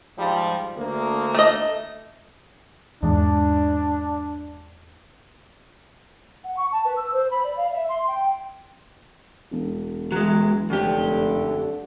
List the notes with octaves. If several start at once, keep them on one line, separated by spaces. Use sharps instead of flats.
G#2 F3 G3
D2 A#3
A3 D#5
E2 G#2 D4
F#5
C#6
A5
B4
E6
C5
B5
D5
F5
E5
C6
G5
E1
E3 F#3 G#3
F1 F#2 D3 G4